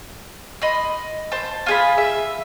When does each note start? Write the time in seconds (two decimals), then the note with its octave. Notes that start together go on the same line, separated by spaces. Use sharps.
0.62 D#5 B5 C6
1.32 C5 A5
1.66 F4 G#4 B5
1.98 E5